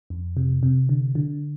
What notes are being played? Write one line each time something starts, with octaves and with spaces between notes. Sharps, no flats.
F2
C3
C3
D3
D3